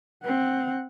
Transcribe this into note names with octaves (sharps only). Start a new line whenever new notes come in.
C4 F#5